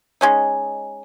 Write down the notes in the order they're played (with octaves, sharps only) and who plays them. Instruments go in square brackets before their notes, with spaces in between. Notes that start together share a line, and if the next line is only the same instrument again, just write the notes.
[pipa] G#3 C#4 D#4